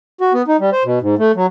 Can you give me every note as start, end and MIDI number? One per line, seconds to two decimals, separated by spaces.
0.21 0.33 66
0.34 0.42 59
0.48 0.57 63
0.60 0.70 55
0.72 0.83 72
0.85 0.99 47
1.02 1.15 44
1.18 1.32 57
1.35 1.46 54